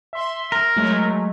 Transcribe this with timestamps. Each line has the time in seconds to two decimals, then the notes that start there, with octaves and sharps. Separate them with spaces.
0.13 E5 C6
0.52 A#4
0.76 F#3 G#3 A3